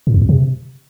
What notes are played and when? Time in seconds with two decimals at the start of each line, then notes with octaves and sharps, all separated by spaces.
0.07 A2
0.14 E2
0.22 F2
0.29 C3